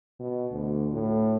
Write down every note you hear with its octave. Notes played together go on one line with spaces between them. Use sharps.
B2
D2
A2